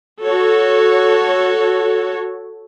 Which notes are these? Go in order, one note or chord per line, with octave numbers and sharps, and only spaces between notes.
F#4 A4 C#5